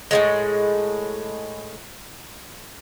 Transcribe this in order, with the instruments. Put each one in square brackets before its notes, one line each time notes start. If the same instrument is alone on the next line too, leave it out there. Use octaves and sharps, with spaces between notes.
[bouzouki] A2 F3 G#3